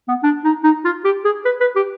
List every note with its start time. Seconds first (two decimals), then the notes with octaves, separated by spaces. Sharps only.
0.09 B3
0.24 D4
0.44 D#4
0.64 D#4
0.85 F4
1.05 G4
1.25 G#4
1.45 B4
1.61 B4
1.76 G4